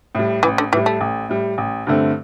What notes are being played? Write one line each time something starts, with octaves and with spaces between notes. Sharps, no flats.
A2 G3
A1 E3
D3
A2 E3 G3
A3
A1
A2 G3
A1
G2 D3 A3 C4